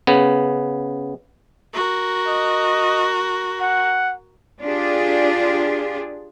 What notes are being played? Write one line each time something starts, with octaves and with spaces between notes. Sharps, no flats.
C#3 B3
F#4 A#4
D#5
F#5
D4 F4 G4 G#4